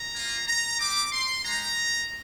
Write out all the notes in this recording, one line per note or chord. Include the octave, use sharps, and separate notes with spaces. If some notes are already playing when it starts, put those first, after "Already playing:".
Already playing: A#5
A#3 F4
A#5
C4 G4 D6
C6
G#3 D#4 G4 A#5